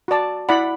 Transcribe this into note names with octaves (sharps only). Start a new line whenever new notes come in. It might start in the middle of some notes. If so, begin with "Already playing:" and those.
F#4 D5 A5
E4 D5 F#5 B5